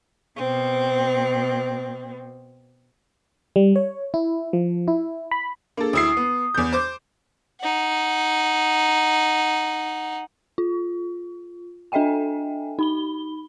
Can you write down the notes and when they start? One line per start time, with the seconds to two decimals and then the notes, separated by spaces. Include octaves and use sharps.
0.36 B2 C4
3.56 G3
3.76 C#5
4.14 E4
4.53 F3
4.88 E4
5.31 B5
5.77 A#3 D4 G#4 A4
5.93 D2 E4 D#6 C7
6.17 B3
6.54 E2 G6
6.73 C5 D6
7.61 D#4 F#5
10.58 F4
11.92 D4 A4 D#5 E5 G5 G#5
12.79 D#4 B5 G7